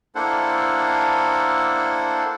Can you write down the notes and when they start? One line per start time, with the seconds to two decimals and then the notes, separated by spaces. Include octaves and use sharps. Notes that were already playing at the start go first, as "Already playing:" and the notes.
0.15 A#3 D4 E4 A4 C5 F#5